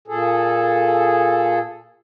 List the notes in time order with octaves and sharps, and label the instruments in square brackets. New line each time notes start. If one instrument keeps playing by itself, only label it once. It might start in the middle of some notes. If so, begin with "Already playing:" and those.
[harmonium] A#2 G#4 A4